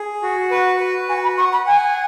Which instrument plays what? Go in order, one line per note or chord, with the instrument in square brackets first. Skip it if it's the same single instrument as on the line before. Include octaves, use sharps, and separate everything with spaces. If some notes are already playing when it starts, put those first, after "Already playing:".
Already playing: [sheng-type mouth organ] G#4
F#4
[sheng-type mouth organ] B4 [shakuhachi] F#5
[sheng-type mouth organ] B4
[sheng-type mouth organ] F#4 [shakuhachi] G#5
[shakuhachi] B5
[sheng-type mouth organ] F#5 [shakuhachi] C#6
[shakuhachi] B5
[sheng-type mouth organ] F#5 [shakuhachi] G#5